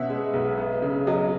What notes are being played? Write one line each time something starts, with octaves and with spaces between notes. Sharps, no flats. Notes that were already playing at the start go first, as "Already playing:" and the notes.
Already playing: B2 C#4 E5 F#5
G#3
B1
B3
C#3
F#3 D#5